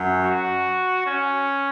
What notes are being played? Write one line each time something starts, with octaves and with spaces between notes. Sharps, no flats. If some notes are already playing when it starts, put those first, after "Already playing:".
Already playing: F#2 F#3
F#4
C#4